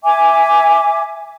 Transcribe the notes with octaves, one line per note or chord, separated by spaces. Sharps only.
E5 G#5 D6